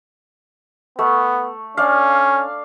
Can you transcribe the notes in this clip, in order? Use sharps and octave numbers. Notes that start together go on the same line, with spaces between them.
A3 B3
C#4 D4 F5